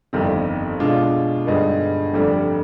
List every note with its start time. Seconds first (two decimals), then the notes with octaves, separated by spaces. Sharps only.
0.13 G1 F2 D#3 G3 C4
0.80 B2 G#3 D4 F4
1.46 G2 D3 G#3 B3 D#4
2.13 F1 F2 D3 G3